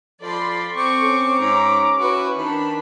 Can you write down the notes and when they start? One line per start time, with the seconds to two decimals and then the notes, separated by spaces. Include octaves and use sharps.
0.22 F3 A4 D5 B5 C6
0.75 C4 C#6 D6
1.04 C#4
1.39 G#2 C#4 A#5
1.99 E4 F#4 B4
2.37 D#3 D4 B5